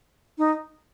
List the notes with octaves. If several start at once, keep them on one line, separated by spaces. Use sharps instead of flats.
D#4